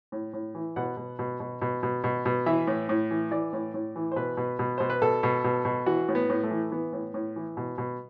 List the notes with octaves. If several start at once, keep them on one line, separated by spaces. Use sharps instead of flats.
A2
A2
E3
B2 F#5
B2
B2
B2
B2
B2
B2
B2
E3 E5
A2
A2
E3
E3 D5
A2
A2
E3
C5
B2 B4
B2
B2
B2 C5
B4
B2 A4
B2
B2
B2
E3 F#4
A2
B3
A2
A3
E3
E3 B3
A2
A2
E3
B2
B2